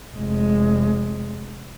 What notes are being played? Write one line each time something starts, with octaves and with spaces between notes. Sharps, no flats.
F1 G#3